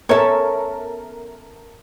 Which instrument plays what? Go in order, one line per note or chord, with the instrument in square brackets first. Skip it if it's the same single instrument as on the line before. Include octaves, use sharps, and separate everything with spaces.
[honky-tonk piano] B3 A#4 E5 [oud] C#4 A4 [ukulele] C#5